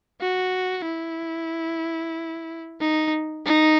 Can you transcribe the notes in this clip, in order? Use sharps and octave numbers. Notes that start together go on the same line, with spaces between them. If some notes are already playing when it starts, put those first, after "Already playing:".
F#4
E4
D#4
D#4